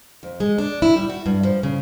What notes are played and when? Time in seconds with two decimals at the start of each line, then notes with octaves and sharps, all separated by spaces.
0.23 F2
0.40 G#3
0.58 D4
0.82 E4
0.96 G3
1.09 F#4
1.26 G2
1.43 F3
1.63 C#3